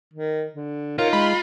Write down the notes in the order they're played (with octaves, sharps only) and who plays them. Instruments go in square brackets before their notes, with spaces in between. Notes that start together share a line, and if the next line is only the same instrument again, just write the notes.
[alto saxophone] D#3
D3
[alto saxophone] D#4 [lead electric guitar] F4 [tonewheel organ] A#4 C#5 F5
[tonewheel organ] G#3 [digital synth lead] B5